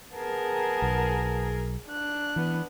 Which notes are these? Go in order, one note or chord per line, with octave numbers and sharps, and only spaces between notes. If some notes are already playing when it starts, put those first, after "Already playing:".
B3 G#4 A#4 A5
B1
D4 F#6
E3 B3